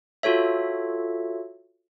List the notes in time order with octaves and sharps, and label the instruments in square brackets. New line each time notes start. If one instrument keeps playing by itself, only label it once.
[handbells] F4 F#4 A4 C#5 E5